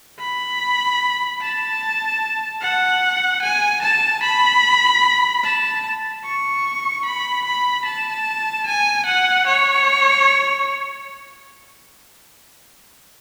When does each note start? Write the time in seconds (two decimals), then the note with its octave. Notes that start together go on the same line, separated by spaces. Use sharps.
0.20 B5
1.41 A5
2.61 F#5
3.43 G#5
3.83 A5
4.23 B5
5.44 A5
6.25 C#6
7.05 B5
7.45 B5
7.85 A5
8.66 G#5
9.06 F#5
9.47 C#5